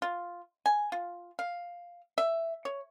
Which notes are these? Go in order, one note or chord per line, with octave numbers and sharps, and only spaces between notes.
F4
G#5
F4
F5
E5
C#5